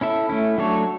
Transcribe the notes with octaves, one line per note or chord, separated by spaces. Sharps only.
C#4 E4 A4 E5
A3 C#4 E4
F#3 A3 D4 A4 C#5